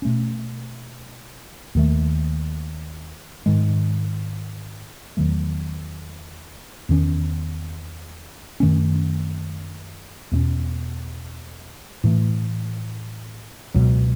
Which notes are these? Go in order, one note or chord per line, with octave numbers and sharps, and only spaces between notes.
B2 A3 C#4
D#2 D#3 A3
G#2 D#3 G#3
E2 D#3 F#3 A3
E2 D#3 A3 C#4
F#2 D#3 A3 C#4
E2 B2 A3 C#4
A2 E3 A3
C#2 B2 F#3